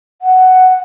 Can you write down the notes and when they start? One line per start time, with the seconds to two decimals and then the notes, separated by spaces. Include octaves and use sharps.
0.22 F#5